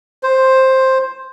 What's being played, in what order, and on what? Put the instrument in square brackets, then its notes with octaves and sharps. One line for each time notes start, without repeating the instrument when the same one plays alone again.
[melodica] C5